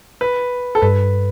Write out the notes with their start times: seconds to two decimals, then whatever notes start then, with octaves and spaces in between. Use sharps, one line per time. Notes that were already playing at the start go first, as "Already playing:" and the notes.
0.21 B4
0.75 A4
0.82 G2 B4